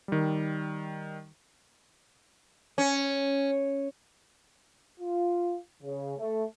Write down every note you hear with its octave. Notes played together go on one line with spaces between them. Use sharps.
D#3 G3
C#4
F4
C#3
A3